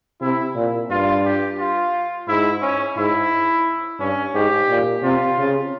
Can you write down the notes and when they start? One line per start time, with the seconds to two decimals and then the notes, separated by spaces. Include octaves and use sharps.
0.21 C3 E4
0.56 A#2
0.90 G2 F4
1.25 G4
1.59 F4
2.28 G#2 E4
2.62 C#4
2.97 G#2 E4
4.00 G2 C#4
4.34 G#2 G4
4.69 A#2
5.03 C3 F4
5.38 C#3